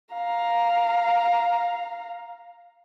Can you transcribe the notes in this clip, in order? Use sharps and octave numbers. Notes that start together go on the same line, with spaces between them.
F5 A#5